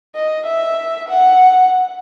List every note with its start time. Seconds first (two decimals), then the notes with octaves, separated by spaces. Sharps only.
0.15 D#5
0.47 E5
1.10 F#5